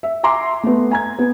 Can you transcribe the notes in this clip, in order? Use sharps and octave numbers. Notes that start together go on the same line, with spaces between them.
E5
E5 G#5 A#5 C6 D6
A3 B3
G#5 A#5 G#6
B3